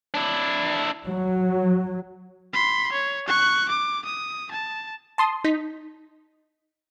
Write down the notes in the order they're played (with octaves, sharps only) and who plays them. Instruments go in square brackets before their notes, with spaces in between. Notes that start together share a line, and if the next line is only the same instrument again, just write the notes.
[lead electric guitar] D4 E4
[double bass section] F#3
[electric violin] B5 C6
C#5
C#6 F#6
D6
D#6
A5
[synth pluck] A5 C6 D#6
D#4 B6